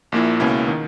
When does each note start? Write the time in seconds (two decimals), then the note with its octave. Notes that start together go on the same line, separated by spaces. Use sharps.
0.12 A#1 A#2 A#3 E4
0.40 C#2 B2 A#3 C#4 E4
0.68 D#3